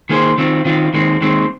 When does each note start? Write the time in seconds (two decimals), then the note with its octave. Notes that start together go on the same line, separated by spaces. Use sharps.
0.09 D#3 A#3 G#4 C5
0.38 D#3 C4 F4
0.65 D#3 C4 F4
0.94 D#2 D#3 G#3 C4
1.21 D#2 D#3 G#3 C4